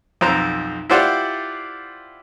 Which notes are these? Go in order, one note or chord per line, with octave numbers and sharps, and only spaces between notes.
B1 F2 C5 A#5
E4 F4 G4 C5 D5 F#5